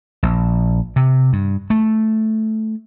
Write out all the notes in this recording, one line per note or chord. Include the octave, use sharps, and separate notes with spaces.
A#1
C3
G2
A3